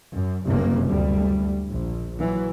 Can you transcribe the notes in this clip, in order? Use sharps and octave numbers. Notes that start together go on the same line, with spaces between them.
F#2
F#1 C2 G2 C#3 A#3
D2 G3
A#1
E3 F#3